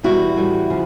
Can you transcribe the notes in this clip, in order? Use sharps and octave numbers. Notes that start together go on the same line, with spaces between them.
E2 B2 G3 E4 F#4
A2 E3 G3
C#3 F3